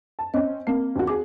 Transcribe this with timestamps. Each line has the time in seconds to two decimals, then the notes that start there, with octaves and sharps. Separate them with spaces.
0.19 A5
0.34 C4 C#4 D#5
0.67 A#3 C4
0.96 D#2 F#4
1.07 F#4 G#4 D6